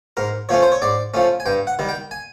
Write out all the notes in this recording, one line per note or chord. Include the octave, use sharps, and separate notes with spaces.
G#2 A#4
F3 A3 C#4 C#5
C5
C#5
G#2 D5
F3 A3 C#4
G#5
G2 G5
F#5
D#3 G3
G5
G#5